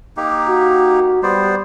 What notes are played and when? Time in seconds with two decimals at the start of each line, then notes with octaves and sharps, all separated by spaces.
0.17 A#3 D#4 G4
0.48 F#4
1.23 G3 B3 C5 D5